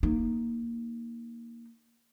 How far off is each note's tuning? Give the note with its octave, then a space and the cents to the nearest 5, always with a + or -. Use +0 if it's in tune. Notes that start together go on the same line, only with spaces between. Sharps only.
A#3 +0 D#4 +0